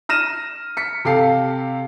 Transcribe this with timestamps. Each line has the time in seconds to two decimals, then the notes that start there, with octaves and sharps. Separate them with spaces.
0.09 F6 A#6 D#7 E7
0.77 B6 C#7
1.05 C3 G4 A4 F5 C7